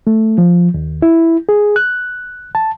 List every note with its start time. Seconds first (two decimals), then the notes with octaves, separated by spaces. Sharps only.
0.07 A3
0.38 F3
0.74 D#2
1.02 E4
1.49 G#4
1.76 F#6
2.55 A5